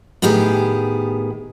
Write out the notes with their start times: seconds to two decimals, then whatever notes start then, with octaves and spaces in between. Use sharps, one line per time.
0.22 A2 D#3 B3 G4 G#4